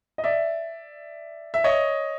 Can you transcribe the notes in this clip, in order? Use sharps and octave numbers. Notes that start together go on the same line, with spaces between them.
D#5
D5 E5
E5
C#5 D#5